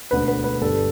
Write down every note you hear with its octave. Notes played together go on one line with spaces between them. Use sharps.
E1 D2 D3 B3 B4
B4
B4
G1 G2 G3 A4